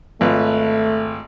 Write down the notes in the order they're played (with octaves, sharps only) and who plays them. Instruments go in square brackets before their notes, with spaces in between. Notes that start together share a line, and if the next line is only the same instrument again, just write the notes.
[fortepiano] G#1 F4 B4 [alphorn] A3